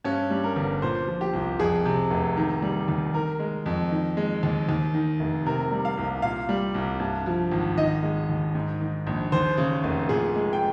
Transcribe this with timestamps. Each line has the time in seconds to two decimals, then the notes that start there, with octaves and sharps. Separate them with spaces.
0.04 G2 C#4
0.30 G3
0.44 A#4
0.56 G1
0.82 A#2 C5
1.07 F3
1.21 G4
1.33 C2
1.59 F2 G#4
1.85 C3
2.11 F1
2.37 D#3
2.62 G3
2.88 D#2
3.14 D#3 A#4
3.39 G#3
3.66 F2
3.91 D#3
4.17 G#3
4.43 D#2
4.69 D#2
4.94 D#3
5.20 F1
5.46 C3 A#4
5.71 G3
5.85 F5
5.97 C2
6.22 A#2 F5
6.49 G3
6.74 C2
7.00 G2
7.26 F3
7.51 G#1
7.77 D#3 D#5
8.03 G#3
8.29 D#2
8.55 G#2
8.80 D#3
9.07 A#1
9.32 D#2 C5
9.57 C#3
9.84 F1
10.09 A#2 G#4
10.36 G#3
10.53 G5